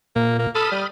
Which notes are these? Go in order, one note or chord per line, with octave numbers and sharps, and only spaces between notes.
A#2 A#3
A#3
A4 B5 D#6 F6
G3